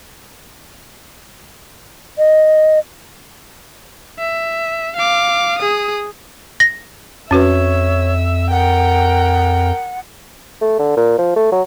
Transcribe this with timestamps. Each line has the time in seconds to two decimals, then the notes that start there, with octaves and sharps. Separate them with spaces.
2.18 D#5
4.19 E5
4.96 F5 D6
5.58 G#4 D#6
6.60 A#6
7.31 F2 C#4 F#4 B4 C#5 E5
8.51 A#4 F#5 G5
10.61 A3
10.79 D3
10.97 A#2
11.18 F3
11.36 A3
11.52 F#3